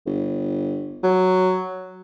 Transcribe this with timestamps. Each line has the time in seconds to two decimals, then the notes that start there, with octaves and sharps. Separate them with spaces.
0.06 G1
1.04 F#3